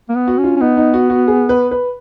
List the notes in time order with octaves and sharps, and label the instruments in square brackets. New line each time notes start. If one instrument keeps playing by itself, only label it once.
[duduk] A#3
B3
[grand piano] F#4
[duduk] C#4
[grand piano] F4
[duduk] C#4
[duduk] B3 [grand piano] D#4
[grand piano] D#4
F#4
F#4
G#4
B4
B4